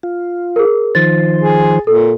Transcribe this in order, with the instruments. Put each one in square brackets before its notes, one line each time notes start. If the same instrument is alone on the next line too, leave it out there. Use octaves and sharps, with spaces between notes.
[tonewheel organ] F4
[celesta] G#4 A#4
[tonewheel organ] D#3 F3 C5 [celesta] A6
[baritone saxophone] G#4
[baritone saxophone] A#2 [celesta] A4